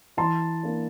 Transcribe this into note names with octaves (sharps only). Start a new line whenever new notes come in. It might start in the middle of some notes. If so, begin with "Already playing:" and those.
E3 A5 C6
A#3 D4